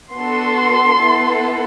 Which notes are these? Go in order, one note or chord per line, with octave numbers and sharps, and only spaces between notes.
B3 D4 F#4 A4 C6
B3 E4 A4